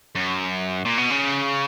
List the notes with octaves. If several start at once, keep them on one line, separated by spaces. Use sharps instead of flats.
F#2
A#2
B2
C#3